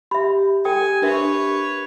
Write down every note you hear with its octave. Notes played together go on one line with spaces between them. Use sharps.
G4 E5 B5
A4 G5 G#5 D#6
D4 A#4 B4 C#5 E5